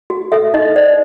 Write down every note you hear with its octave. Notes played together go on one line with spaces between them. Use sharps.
F#4
A4 E5
D#4 D#5
C5 D5